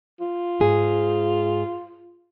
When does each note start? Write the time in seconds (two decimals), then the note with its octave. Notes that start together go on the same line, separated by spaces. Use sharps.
0.20 F4
0.60 G#2 G#4